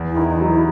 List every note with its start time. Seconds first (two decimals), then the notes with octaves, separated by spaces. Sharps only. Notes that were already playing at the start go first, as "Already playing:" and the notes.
Already playing: E2
0.11 E4
0.16 D#3
0.29 D#4
0.41 F#3
0.47 E4